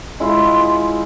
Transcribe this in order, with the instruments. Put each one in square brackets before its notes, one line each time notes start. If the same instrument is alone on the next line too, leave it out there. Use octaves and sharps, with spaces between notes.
[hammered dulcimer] G#3 E4 F4